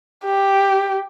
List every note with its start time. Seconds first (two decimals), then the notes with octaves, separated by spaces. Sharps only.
0.25 G4